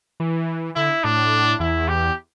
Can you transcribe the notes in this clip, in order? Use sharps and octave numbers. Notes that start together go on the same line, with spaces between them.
E3
D3 E4
A2 D4
E2 E4
G4